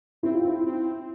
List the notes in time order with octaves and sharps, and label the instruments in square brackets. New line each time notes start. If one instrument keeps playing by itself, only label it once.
[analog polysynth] C4 [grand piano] E4
[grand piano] F4
E4
[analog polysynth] C4